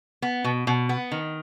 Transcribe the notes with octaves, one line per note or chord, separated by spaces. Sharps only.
B3
B2
B2
B3
D#3